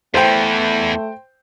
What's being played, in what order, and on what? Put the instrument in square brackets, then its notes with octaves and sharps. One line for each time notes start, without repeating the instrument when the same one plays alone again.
[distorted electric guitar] E2 E3 [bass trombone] A3 [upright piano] C5 G5